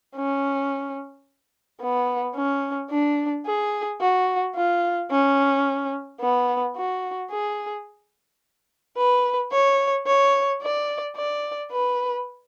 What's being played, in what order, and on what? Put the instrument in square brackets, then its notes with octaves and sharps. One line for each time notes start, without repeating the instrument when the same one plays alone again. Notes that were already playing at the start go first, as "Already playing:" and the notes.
[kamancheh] C#4
B3
C#4
D4
G#4
F#4
F4
C#4
B3
F#4
G#4
B4
C#5
C#5
D5
D5
B4